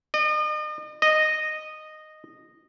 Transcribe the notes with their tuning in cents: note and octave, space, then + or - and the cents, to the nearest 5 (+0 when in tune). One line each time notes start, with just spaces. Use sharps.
D#5 -40
D#5 -10